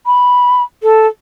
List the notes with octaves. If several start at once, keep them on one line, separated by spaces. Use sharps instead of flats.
B5
A4